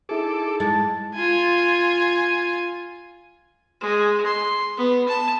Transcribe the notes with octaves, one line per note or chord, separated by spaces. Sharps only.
D#4 E4 G#4 A4 D6
G#3 A5
F4 G#5
G#3
C6
B3
A5